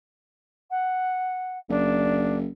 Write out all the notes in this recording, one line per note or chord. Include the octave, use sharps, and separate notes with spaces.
F#5
F#1 D4